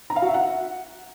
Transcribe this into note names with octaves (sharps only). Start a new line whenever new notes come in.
A#5
F5
F#4
E5
F#5